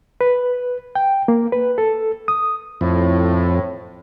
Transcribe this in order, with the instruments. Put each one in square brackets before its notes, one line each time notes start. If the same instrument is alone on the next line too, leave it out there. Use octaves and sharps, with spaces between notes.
[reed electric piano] B4
G5
A#3
B4
A4
D#6
[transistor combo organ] F2 [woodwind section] A2